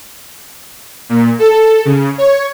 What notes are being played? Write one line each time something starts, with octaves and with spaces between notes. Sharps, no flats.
A#2
A4
C#3
C#5